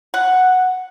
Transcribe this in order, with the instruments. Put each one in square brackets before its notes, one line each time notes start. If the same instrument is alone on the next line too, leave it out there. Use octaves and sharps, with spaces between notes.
[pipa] F#5